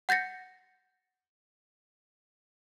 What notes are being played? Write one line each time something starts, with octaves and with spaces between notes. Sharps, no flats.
F#5 G6 A6 A#6 C#7